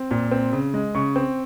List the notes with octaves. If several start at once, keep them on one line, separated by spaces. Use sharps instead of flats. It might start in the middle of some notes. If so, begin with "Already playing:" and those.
Already playing: C4
A#2
C4
C#3
G#3
C#3 C#6
C4